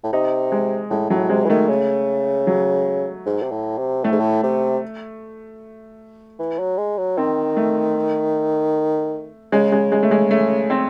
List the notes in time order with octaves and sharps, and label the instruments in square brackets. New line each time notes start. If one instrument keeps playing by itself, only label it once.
[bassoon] A2
[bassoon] C3 [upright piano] D#4
[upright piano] G#3
[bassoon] A2 [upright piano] G#3
[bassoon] A2 [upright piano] F#3
[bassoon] C3 [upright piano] G#3
[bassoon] E3
[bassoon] D#3 [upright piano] A3
[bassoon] C#3
[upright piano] F#3
[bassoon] G#2
C3
A2
C3
[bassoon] A2 [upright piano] A3
[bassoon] G#2
A2
C3
E3
F#3
G#3
F#3
[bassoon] D#3 [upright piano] C4
[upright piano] A3
[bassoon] C#3 [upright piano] G#3
[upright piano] G#3
G#3
A3
G#3
A3
C4